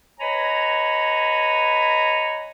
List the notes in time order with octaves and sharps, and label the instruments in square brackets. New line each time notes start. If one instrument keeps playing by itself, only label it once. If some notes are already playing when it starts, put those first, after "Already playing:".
[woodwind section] B4 C#5 D#5 G#5 A#5 B5